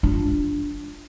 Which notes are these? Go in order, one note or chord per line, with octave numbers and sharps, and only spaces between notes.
D4 F4